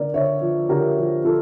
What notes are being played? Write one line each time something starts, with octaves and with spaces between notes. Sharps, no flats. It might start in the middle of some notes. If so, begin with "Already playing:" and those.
Already playing: D3 A#3 A#4 D5
D3 C#5 E5
F3
D3 G4 A#4
F3 G4
F3 F4 A4